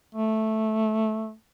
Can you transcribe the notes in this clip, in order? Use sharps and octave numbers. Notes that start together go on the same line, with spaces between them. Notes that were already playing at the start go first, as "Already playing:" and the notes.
A3